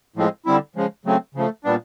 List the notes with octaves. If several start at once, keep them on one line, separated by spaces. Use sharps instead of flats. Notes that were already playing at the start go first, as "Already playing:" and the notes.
A2 F3 G#3 C4
D3 G3 C4 E4
C#3 F3 G#3
C#3 F#3 A3 C4
C#3 F3 A3
A#2 G3 B3 D4